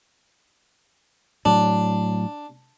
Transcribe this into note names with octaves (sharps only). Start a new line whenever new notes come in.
A2 F#3 D4